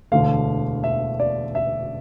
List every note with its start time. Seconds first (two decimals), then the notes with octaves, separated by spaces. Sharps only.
0.12 E1 D2 D3 A3 F5
0.84 E5
1.20 D5
1.55 E5